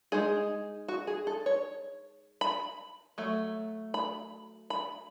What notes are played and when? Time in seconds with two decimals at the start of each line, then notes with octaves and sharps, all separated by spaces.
0.12 G#3 D#4 G#4
0.88 F#4
1.07 G#4
1.27 A4
1.46 C#5
2.41 B5
3.18 F#3 A3
3.94 B5
4.70 B5